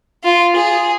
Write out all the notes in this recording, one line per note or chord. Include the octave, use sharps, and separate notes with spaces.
F4
G#4